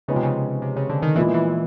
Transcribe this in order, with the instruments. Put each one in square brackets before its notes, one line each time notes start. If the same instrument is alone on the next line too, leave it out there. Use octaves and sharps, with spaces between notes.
[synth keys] C#3 [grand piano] F3 G#3 B3 D#4
[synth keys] C3
C#3
C3
C#3
D3
D#3
[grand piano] A#2 F3 G#3 B3 E4 [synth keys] E3
[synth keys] E3